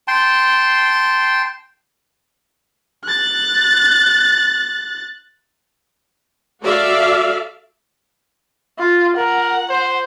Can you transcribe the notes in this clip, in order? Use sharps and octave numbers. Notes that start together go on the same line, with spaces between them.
G5 A5 C6
F#6 A6
F#4 A4 D5 E5 F5
F4
A#4 F#5
C5